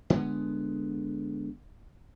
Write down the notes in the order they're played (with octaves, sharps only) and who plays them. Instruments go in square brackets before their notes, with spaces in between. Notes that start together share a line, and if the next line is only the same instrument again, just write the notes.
[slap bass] D3 G#3 B3